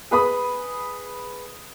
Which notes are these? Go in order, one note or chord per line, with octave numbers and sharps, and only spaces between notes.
G#4 B4 B5 D#6